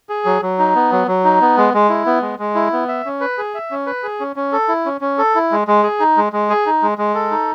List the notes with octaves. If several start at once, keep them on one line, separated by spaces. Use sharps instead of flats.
G#4
F#3
F#3
D#4
B3
F#3
F#3
D#4
B3
G#3
G#3
E4
B3
G#3
G#3
E4
B3
E5
C#4
B4
G#4
E5
C#4
B4
G#4
C#4
C#4
A4
E4
C#4
C#4
A4
E4
G#3
G#3
G#4
D#4
G#3
G#3
G#4
D#4
G#3
G#3
A4
D#4